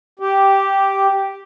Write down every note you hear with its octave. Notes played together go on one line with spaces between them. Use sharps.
G4